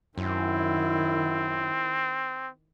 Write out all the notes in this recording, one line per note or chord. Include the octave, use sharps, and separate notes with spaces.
F#2 D#3 C4 E4